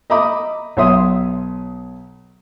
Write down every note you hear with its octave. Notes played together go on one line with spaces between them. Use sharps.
D#5 E5 A#5 B5 D6 D#6
B1 C#5 E5 C6 D#6